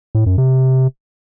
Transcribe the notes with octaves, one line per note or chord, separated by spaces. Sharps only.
A2
F#2
C3